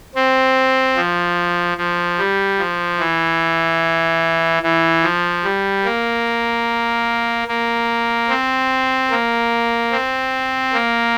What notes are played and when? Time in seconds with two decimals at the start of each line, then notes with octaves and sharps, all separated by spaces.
0.15 C4
0.96 F3
1.78 F3
2.19 G3
2.59 F3
3.00 E3
4.63 E3
5.03 F3
5.44 G3
5.84 A#3
7.48 A#3
8.29 C4
9.11 A#3
9.91 C4
10.73 A#3